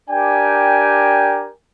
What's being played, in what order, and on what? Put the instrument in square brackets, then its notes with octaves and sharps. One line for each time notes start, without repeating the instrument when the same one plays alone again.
[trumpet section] D4 G4 A#4 D5 G5 G#5